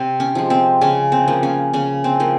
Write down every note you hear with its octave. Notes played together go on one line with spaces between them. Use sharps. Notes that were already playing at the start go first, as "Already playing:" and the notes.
Already playing: C3 C4
C#4
F3 G#3
C4
C#3 C#4
C4
F3 A#3
C#4
C#3 C#4
C4
F3 A#3